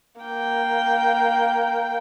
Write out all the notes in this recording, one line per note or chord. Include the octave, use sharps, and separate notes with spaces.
A#3 G5